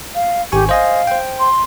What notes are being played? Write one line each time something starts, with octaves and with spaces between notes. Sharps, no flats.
F5
G#1 G4 G#5 C#6
C5 D#5 F5 G#5
C5 G5
C6